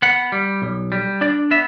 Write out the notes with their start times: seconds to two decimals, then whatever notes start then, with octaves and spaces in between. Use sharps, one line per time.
0.02 B3 F#5
0.32 G3
0.62 B1
0.92 G3
1.21 D4 D5
1.51 B3 E5